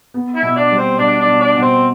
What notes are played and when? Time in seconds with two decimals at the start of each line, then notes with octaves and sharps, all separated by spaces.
0.14 B3
0.36 E4 E5
0.42 B2
0.56 D4 D5
0.71 G3
0.77 C4 C5
0.98 B2 D4 D5
1.20 D4 D5
1.27 B2
1.41 D4 D5
1.56 B2
1.62 C4 C5